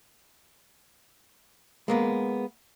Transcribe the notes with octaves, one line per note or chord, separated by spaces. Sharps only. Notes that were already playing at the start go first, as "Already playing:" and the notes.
G#3 A#3 B3